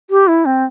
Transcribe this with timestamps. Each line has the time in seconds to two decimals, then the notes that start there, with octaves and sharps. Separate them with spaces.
0.10 G4
0.27 E4
0.45 C4